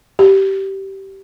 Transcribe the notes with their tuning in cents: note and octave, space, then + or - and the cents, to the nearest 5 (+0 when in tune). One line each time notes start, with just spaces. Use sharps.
G4 -20